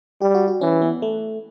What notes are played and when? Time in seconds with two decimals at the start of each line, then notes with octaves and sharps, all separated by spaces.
0.22 G3 G4
0.35 F#4
0.48 F#4
0.61 E3 C#4
0.82 B3
1.02 A3